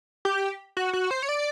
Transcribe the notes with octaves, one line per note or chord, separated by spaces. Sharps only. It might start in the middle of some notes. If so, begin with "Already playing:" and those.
G4
F#4
F#4
C5
C#5
D5